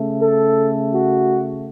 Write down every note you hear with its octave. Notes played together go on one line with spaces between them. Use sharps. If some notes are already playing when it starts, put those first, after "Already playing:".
Already playing: C#3 A3
A4
F#4